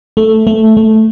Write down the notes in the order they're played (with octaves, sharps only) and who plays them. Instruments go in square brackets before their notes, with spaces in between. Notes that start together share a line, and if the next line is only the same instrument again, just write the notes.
[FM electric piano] A3
A3
A3